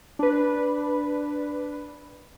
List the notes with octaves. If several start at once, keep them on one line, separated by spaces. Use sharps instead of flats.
D4 B4